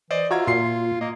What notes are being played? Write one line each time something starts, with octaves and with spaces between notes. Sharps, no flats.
E3 C5 D5 D#5
F4 F#4 E5 A#5 G#6
A#2 C6 C7
A#3 D#5